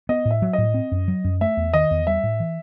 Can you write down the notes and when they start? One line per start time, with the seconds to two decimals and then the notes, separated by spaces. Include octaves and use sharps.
0.09 B3 D#5
0.25 A2
0.31 E5
0.42 F#3
0.53 A2 D#5
0.74 C4
0.92 F#2
1.08 F#3
1.24 F#2
1.41 A3 E5
1.57 E2
1.73 D#3 D#5
1.91 E2
2.07 G3 E5
2.23 A2
2.40 E3